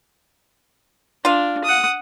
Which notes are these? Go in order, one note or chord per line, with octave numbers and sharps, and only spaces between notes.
D4 F4 F5
F#5 D#6